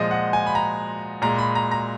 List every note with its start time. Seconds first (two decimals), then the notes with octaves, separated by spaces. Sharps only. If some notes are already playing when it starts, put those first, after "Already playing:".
Already playing: A#2 F3 G#3 D#5
0.11 F#5
0.33 G#5
0.46 B5
0.55 A#5
1.22 A#2 G#3 A#5
1.38 B5
1.55 A#5
1.71 A#5